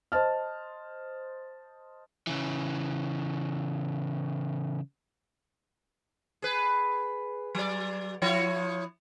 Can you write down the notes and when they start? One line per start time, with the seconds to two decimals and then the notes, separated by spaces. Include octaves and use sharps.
0.12 C5 D#5 A5 F6
2.27 C#3 E3
6.42 G#4 B4
7.55 F#3 D5
8.22 F3 E4 C#5